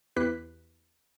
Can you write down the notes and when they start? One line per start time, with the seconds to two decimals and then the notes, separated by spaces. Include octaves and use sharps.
0.16 E2 E4 G4 B4 F#6 B6